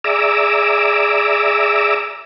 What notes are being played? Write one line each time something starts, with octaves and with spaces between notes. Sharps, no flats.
G#4 D5 E5 A#5 D6 E6